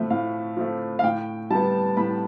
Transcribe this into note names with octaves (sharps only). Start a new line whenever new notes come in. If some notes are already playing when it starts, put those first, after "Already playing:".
Already playing: A2 F3 A3 E5
A2 F5
F3 A3
F5
A2 G5
G3 B3 A5
A2 B5